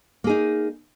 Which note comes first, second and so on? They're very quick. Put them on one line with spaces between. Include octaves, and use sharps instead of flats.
A#3 G#4 D#4